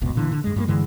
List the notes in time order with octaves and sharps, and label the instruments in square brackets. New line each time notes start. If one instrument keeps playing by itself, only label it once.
[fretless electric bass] F#1 C#2 B2
A#2 D3 E3
D3
G2 G#3
G2 F#3 A#3
G2 D3 E3 G#3